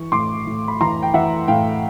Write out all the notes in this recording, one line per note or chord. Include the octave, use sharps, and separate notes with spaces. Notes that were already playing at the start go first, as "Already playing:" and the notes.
Already playing: E3 C#6
A2 C6 D6
A2
B5
E3 A#5 C6
G5
E3 E5 F#5
A2 F5 G5